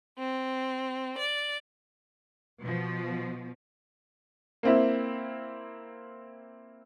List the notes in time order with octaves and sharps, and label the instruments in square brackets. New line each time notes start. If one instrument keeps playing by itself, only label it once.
[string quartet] C4
D5
[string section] B2 F3
[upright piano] A#3 C4 E4